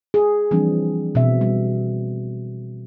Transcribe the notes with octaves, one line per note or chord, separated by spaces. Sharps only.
G#4
E3 F3 G3 C4 D4
B2 C4 E5
G3